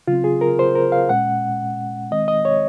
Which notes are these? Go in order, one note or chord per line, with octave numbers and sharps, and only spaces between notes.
C#3 F#3 C4 F4
G#4
A#4
C5
A#4
F5
A#2 G#3 C#4 F#5
D#3 G#3 C4 D#5
D#5
C#5